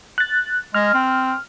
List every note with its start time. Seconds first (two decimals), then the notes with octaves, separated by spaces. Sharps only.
0.18 F#6 A6
0.74 G#3 F6
0.94 C4